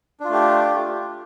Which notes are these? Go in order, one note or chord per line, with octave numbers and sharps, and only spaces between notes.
A3 D4 F4 G4